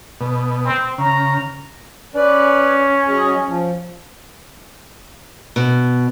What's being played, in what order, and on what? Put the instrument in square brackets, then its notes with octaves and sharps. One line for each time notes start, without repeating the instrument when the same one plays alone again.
[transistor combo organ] B2
[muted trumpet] C4
[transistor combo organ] C#3 [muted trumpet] A#5
[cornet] C#4 [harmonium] B4 D5
[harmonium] F#3 G#4 D#5
F3
[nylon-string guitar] B2